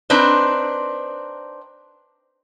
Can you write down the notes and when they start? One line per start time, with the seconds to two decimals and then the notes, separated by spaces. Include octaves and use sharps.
0.10 C4 D4 D#4 B4 C5